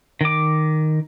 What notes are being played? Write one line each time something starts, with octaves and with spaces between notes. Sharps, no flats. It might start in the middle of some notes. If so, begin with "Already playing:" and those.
D#3 D6